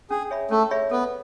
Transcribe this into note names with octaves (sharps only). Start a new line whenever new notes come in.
C#4 G#4
G#4 C#5 E5 B5
A3 C#4
G#4 C#5 E5 B5
B3 A4